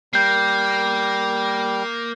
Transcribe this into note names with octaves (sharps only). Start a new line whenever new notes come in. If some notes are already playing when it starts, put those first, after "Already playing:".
G3 A#3 G6 C7